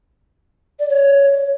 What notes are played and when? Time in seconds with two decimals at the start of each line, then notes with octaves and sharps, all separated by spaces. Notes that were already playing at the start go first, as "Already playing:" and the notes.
0.80 D5
0.89 C#5